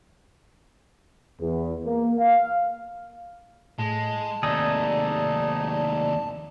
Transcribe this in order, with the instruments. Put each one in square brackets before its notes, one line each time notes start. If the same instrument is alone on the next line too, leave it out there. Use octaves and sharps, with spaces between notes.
[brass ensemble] E2
A#3
F5
[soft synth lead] A2 [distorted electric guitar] G#3 [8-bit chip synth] A5
[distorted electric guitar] D#2 C3 [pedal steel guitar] A3 D#4 G#4 [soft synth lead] D5